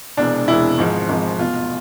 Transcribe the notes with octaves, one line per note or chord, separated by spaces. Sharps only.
E1 E2 C3 E3 G#3 D4
E1 E2 C3 E3 G#3 E4
G#1 G#2 F3 G#3
G#1 G#2 F3 G#3
F1 E2 B2 F4